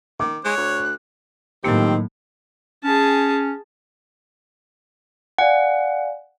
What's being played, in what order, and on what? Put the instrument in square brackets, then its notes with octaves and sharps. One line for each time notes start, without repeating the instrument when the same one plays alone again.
[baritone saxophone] D#3 [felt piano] D6
[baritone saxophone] G#3 [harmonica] C#5 [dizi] F#6
[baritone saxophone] D2
[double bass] A2 [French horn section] D#3 [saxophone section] F3 C4 G4 [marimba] F#3 A#3
[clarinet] C#4 [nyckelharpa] G#4 A5
[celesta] D5 F5 G#5 [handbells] F#5